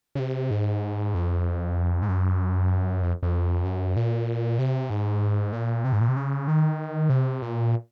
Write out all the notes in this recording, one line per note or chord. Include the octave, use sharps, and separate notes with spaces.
C#3
C3
G#2
F2
G#2
F#2
F2
F2
F#2
A#2
C3
G#2
A#2
C3
G#2
A#2
C3
C#3
D#3
C3
A#2